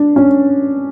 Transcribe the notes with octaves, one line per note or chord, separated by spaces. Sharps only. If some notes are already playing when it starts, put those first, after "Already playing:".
Already playing: D4
C#4